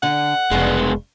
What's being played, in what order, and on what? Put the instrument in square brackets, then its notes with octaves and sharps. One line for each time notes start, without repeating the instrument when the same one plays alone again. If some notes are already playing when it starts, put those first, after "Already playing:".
[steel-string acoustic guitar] D3 [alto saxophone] F#5
[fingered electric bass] F1 [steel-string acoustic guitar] G2 C#3 [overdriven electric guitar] G#3 B3